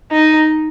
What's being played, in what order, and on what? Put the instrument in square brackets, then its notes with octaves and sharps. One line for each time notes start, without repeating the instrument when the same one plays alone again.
[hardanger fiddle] D#4